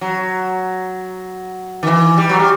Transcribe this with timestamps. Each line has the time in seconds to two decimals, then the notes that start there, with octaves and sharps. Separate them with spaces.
0.01 F#3
1.83 D#3
1.87 E3
2.18 G3
2.29 F#3
2.39 G3